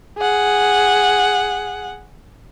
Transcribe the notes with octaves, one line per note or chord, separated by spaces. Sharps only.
G#4 F#5